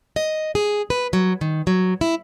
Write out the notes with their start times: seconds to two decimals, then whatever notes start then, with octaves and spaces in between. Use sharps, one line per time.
0.16 D#5
0.55 G#4
0.90 B4
1.13 F#3
1.41 D#3
1.67 F#3
2.01 E4